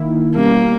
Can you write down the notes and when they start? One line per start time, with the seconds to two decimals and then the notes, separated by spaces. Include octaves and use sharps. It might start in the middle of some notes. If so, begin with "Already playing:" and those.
Already playing: D#3 A#3 E4
0.35 B2 G3 A#3 C#4 G4